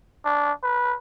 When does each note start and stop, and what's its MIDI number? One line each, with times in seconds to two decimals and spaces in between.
0.25 0.52 62
0.63 0.97 71